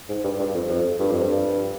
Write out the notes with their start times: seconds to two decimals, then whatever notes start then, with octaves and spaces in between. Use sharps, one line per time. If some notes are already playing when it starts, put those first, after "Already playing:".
0.09 G#2
0.24 G2
0.39 G2
0.55 F2
0.69 F2
1.00 G2
1.11 F2
1.22 G2